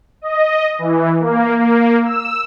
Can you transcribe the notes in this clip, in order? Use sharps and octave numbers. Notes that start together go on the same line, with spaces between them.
D#5
E3
A#3
A#3
E6